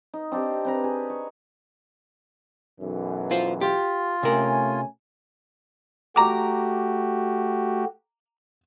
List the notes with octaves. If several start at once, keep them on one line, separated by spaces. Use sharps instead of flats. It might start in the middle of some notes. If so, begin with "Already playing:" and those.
D#4
C4 D4 D#4 G4
C4 B4 A#5
G#4
C#6
B1 F#2 E3
F4 C5
F4 G4
C3 A3 C#4 A#4 G#5
A3 F#4 G4 A#5 D6